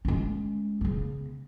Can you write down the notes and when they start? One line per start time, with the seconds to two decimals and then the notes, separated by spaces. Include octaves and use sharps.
0.05 G#3 C#4
0.81 C#3 B3